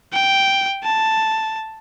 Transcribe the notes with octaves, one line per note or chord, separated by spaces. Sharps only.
G5
A5